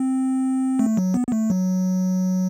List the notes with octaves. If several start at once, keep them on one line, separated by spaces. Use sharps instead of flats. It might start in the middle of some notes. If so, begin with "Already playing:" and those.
Already playing: C4
A3
F#3
B3
B3
A3
F#3